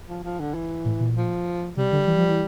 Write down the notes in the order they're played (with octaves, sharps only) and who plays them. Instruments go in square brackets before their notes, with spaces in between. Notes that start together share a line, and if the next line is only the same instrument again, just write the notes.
[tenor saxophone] F3
F3
D3
E3
[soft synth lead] A2
A#2
[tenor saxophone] F3
[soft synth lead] C3 [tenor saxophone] G3
[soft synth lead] D3
E3
F3
E3